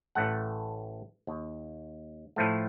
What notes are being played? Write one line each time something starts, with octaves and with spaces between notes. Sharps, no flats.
A1 A2 A3 F#5
D#2
A2 F3 A3